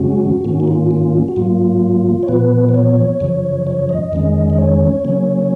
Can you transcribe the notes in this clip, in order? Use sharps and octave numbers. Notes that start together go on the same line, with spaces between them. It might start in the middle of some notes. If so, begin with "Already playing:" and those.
Already playing: F#2 C#3 G#3 C#4 F#4
G#2 D#3 A#3 C#4 F#4
D#4
F4
F4
F#4
G#2 F#3 A#3 F4
C#5
A#2 F3 B3 B4
B4
C#5
F#2 C#3 F3
C#5
D#5
F2 D#3 G#3 C#4
D#5
C#5
C#3 F#3 A#3 C#4